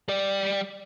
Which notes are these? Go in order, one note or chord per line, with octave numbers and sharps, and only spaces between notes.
G3 D5